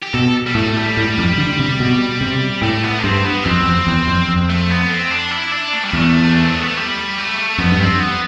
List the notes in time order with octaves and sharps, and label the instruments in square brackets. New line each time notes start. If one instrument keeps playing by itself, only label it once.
[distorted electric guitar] G4
[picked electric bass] B2 [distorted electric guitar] A4
[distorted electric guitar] G3
[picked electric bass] A2 [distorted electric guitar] A3
[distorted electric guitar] G3
[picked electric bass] A2
F2
D3
C3
B2
C3
[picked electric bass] A2 [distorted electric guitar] A3
[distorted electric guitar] B3
D4
[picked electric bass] G2 [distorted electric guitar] C4
[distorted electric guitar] B3
[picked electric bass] F2 [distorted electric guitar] C4
[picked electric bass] E2
F2
E2
F2
F2
[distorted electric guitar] A3
B3
C4
D4
E4
D4
A3
G3
[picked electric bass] E2 [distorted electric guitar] A3
[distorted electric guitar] D4
C4
B3
A3
G3
A3
[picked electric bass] F2 [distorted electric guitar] B3
[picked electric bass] G2
[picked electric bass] F2 [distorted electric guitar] C4
[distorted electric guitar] B3